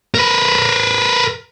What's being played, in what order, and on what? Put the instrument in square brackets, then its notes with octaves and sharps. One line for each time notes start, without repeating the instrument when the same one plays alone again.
[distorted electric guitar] A#4 B4